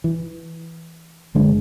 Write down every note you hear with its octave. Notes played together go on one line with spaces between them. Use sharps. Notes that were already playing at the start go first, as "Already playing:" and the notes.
E3
F#1 D3 G#3 D4